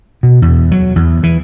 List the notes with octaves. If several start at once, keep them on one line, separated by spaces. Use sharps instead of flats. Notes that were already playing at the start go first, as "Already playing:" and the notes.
B2
E2
F#3
E2
E3